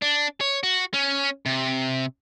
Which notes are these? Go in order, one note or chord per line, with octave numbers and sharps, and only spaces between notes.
D4
C#5
F#4
C#4
C3